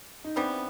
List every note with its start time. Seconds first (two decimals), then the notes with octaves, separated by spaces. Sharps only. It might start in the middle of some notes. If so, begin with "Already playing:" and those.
0.24 D#4
0.36 E3 G3 B3 C4 D4